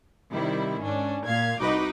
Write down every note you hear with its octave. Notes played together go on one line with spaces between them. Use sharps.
C3 D#3 G3 E4
G#2 C#4 D4
A#2 F5 G#6
C2 D#4 F#4 B4 D#5 D6